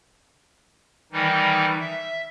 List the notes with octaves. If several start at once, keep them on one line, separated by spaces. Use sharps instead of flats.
D#3 E3 G3 D#4
E5